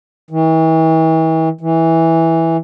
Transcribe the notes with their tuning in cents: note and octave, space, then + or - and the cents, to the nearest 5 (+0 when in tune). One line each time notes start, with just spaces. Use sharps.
E3 -40
E3 -10